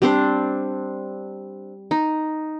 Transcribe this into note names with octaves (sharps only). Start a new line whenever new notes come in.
G3 C4 D4 C5
D#4